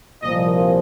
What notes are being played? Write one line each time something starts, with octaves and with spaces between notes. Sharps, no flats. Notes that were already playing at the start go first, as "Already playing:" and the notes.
C2 A#2 F3 D#5